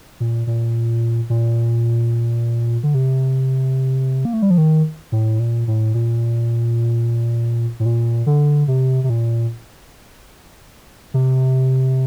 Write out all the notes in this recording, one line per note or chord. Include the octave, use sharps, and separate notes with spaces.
A#2
A#2
A#2
D3
C3
A#3
A3
G3
F3
D#3
A2
A#2
A2
A#2
A2
A#2
D3
C3
C3
A#2
C3